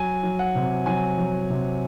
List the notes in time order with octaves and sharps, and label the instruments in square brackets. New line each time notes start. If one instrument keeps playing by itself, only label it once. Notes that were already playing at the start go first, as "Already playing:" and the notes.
Already playing: [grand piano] F#3 G#5
F#3
F#5
C3
F#3 G#5
F#3
C3